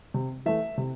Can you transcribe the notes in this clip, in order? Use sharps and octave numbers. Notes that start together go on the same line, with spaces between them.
C3
E3 A3 E5
C3